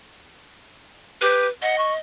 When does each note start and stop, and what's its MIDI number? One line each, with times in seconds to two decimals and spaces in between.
1.21 1.47 67
1.21 1.49 71
1.62 1.97 75
1.62 1.76 78
1.78 1.93 85